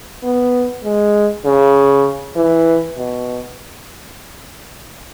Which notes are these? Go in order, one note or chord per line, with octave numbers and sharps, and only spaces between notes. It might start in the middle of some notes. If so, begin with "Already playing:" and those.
B3
G#3
C#3
E3
B2